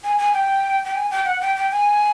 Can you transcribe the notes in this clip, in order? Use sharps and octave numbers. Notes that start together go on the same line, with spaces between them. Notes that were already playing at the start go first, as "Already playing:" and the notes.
G#5
G#5
G5
G5
G#5
G5
F#5
G5
G5
G#5